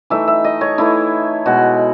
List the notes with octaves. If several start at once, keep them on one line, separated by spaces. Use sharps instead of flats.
E3 A3 D#4 E5
E5
D#5
C#5
E3 A3 D#4 E4
B2 G#3 B3 F#4